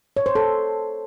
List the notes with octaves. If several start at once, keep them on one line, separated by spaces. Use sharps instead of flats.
C#5
C5
A4